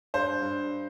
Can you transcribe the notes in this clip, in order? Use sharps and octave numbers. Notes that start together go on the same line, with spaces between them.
G2 C5
G2